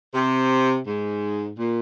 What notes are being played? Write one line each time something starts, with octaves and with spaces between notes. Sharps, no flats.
C3
G#2
A#2